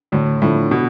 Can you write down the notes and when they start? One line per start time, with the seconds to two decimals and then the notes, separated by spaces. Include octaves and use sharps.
0.12 D2 A2
0.42 A2 D3 F3 A3 E4
0.71 B2